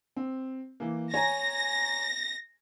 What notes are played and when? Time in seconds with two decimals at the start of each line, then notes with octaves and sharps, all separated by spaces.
0.16 C4
0.80 E3 A#3
1.14 C#5 G#5 A#5 A#6